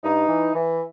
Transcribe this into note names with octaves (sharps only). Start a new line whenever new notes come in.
G2 D#4
E3
E3